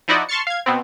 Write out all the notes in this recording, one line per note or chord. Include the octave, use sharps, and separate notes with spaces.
F3 D#4 E4 F#4 D5 D#5
A5 C6 C#6 F6 A6 C#7
F5 G#6
B2 B3 C4